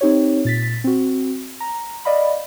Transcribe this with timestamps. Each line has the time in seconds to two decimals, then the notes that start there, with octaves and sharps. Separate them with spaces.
0.01 C4 D#4 G4 C#5
0.45 A#2 A6 B6
0.84 C4 F#4
1.60 A#5
2.05 D5 D#5 F5 B5